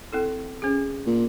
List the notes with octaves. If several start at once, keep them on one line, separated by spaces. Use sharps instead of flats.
C4 E4 A4
C#4 G#4
A#2